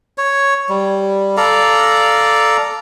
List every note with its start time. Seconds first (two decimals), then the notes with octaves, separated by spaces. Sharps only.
0.18 C#5
0.69 G3
1.37 A4 D5 F5 A#5